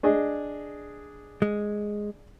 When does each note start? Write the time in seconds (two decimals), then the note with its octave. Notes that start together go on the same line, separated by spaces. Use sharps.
0.03 D4 G#4 D#5
1.42 G#3